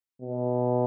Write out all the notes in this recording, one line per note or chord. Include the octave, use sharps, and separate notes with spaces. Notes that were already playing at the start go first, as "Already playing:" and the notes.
B2